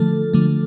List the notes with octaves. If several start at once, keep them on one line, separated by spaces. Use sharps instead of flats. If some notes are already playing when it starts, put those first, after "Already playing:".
Already playing: D3 F3 A3 A4
D3 F3 A3